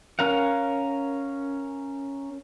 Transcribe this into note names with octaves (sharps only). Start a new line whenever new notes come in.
C#4 A#4 F5 F#5